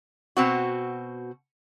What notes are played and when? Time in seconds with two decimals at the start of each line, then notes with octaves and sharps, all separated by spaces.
0.37 B2 C4 F#4